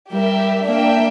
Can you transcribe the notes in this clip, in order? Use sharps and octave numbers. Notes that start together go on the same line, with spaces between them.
G3 G4 A#4 E5
A#3 D4 A#4 E5 G5